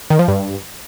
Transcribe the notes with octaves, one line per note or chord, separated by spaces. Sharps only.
D#3
F3
G2